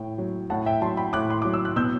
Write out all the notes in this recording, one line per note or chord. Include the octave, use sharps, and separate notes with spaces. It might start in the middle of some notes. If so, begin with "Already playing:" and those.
Already playing: A2 G5
F#3
A2 F#5 A5
E5 G5
F#3 A5 C6
G5 B5
A2 D6 F#6
C6
F#3 D6
E6
F#6
B2 E6 G6